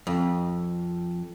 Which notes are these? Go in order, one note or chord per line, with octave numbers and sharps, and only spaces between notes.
F2